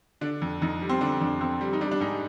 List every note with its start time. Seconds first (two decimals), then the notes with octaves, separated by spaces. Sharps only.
0.21 D3 D4
0.42 F2
0.62 F2 D#4
0.82 G3
0.89 C4
1.01 D3 D4
1.21 F2 D4
1.41 F2 C4
1.61 G3
1.73 D#4
1.81 G3 D4
1.91 D4
2.00 G#2 D#4